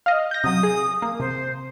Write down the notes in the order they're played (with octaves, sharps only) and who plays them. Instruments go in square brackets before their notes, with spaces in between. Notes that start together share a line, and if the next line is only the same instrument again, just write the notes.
[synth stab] D#5 F5
G6 A#6
[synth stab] C3 F#3 [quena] D#6
[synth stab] G#4
A#3
[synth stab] C3 [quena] C5